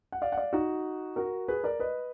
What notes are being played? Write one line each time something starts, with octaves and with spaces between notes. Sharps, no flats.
F#5
D5 F5
F#5
D5 F5
D#4 F#4
F#4 A#4
G#4 B4
A#4 D5
B4 D#5